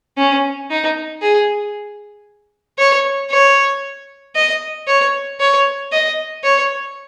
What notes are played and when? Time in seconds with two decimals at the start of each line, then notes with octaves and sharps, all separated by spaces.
0.17 C#4
0.70 D#4
1.22 G#4
2.78 C#5
3.30 C#5
4.35 D#5
4.87 C#5
5.40 C#5
5.92 D#5
6.44 C#5